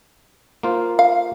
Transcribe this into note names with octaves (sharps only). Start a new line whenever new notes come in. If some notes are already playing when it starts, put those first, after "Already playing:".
A#3 F4 C5
F5